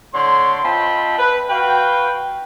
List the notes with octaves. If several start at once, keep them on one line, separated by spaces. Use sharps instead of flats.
A2 D3 C#5 C6
C4 F4 D#5 G5 A5 B5
B4
F#4 B4 F5 G5